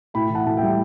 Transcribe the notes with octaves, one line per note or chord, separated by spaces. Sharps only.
A2 G5 B5
E3
F#5 A5
A2 A5
E5 G5
G3